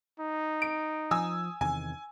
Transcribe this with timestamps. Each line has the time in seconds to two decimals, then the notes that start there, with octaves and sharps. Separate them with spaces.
0.20 D#4
0.62 D7
1.11 F3 G#5 D#6 E6
1.61 E2 C3 D#3 G#5